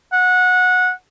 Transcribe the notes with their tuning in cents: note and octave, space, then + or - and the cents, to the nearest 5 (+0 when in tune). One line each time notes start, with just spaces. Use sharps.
F#5 -20